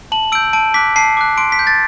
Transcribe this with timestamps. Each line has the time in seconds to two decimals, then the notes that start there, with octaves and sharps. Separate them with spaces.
0.12 A5 F#7
0.32 E6 D7
0.35 G6
0.53 A5 D7
0.74 D6 F#6 B6
0.96 A5 C7
1.17 D6 F#6
1.37 C6 D7
1.52 B6
1.59 G6
1.67 A6